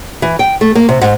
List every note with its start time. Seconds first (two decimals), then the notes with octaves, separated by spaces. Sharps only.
0.22 E3
0.39 G5
0.61 A3
0.75 A#3
0.89 C3
1.01 G#2